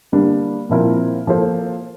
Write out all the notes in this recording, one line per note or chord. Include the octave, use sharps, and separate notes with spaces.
D3 G3 A#3 D4
A#2 F3 C4 E4 A#4
F3 A#3 F4 A4 C5